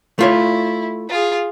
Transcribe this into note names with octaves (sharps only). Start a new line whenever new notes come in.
A3 E4 F4 C#5
F4 G#4